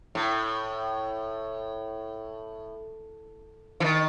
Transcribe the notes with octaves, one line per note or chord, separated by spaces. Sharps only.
A2
E3
D#3